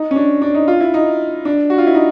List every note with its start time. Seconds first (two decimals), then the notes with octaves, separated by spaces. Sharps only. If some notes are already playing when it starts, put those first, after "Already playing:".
Already playing: D#4
0.11 C#4
0.16 D4
0.42 D4
0.55 D#4
0.68 F4
0.81 E4
0.94 D#4
1.45 D4
1.70 F#4
1.78 F4
1.87 E4
1.95 D#4